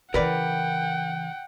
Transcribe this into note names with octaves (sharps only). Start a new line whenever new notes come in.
C#3 E3 A#4 B4 D5 F#5 G5